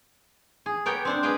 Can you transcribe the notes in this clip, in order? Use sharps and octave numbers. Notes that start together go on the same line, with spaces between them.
G#4
B3 G4 A#4 C#5 G5
C4 D4 C5
G#4 B4 D#5 F5 G5